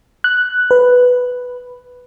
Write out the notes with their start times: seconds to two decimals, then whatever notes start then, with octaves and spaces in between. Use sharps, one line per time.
0.24 F#6
0.71 B4